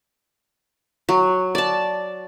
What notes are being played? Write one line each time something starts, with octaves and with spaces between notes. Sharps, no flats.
F#3
D5 A5